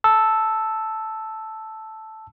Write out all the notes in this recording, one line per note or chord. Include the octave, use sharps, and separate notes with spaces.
A5 E6